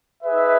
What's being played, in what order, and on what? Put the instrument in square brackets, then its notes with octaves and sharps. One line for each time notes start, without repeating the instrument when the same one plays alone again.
[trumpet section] D#4 G#4 B4 E5